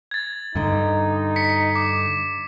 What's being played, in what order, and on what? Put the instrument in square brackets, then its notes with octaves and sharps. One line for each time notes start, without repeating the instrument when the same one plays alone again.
[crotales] G#6 A6
[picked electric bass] G2 D3 [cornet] D#4
[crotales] B6 C#7
D6